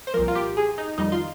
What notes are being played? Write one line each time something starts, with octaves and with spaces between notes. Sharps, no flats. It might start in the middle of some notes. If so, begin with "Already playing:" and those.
C5
C2 A#2 F3 A#4
F4
G4
G#4
D#4
F2 D#3 G3 D#4
F4